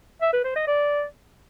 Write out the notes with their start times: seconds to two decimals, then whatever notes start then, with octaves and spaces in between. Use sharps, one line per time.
0.22 E5
0.33 B4
0.44 C5
0.56 D#5
0.67 D5